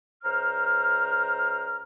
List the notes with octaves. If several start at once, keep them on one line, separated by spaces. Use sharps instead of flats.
C#2 C5 A#5 F6